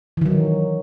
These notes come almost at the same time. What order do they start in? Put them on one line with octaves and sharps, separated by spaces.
E3 D#3 F#3